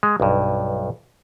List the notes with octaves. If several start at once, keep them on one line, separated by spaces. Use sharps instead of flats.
G#3
B1 G2